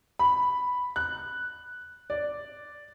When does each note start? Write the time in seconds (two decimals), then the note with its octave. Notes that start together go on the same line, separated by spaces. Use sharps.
0.19 B5
0.96 F#6
2.10 D5